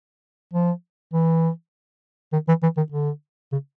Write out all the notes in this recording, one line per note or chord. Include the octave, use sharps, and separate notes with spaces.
F3
E3
D#3
E3
E3
D#3
D3
C#3